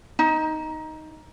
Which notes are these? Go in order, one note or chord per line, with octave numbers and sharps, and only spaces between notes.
D#4